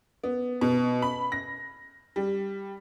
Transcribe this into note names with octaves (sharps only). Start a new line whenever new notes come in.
B3
B2
B5
A#6
G3